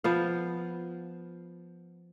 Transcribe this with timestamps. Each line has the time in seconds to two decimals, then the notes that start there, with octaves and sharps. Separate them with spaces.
0.04 F3 B3 F5